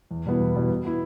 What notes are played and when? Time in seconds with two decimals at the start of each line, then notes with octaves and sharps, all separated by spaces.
0.11 E2
0.26 B2 G3 B3 E4
0.40 E2
0.55 B2 G3 B3 E4
0.70 B2
0.85 B3 E4